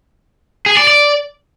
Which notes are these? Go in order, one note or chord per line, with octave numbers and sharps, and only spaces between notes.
G#4
D5
D5